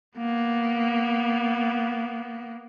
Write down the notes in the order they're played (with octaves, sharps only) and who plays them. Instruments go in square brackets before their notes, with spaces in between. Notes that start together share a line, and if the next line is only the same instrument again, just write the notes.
[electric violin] A#3 B3